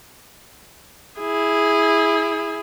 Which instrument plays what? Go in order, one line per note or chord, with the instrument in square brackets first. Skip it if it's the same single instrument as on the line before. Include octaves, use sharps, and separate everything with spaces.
[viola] E4 G#4